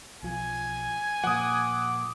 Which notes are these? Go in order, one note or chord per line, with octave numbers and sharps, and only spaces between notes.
B1 F3 G#5
A#2 F3 F#5 D6 D#6